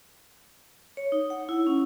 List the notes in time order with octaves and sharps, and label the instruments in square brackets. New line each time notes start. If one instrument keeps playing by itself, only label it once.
[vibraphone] C#5
D#4
F#5
E4
C#4